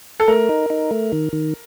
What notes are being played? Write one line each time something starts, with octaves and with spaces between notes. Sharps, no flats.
A4
A3 A#4
D#4
D#4
A3
D#3
D#3